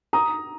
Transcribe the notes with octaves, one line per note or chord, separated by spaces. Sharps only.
A#5 D#6